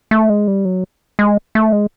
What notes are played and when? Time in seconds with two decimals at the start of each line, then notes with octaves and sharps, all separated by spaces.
0.11 A3
0.30 G#3
0.48 G3
0.65 F#3
1.19 G#3
1.55 A3
1.72 G#3